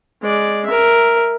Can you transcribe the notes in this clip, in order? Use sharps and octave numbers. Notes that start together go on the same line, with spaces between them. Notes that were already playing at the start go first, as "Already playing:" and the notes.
G#3 D5
A#4 E5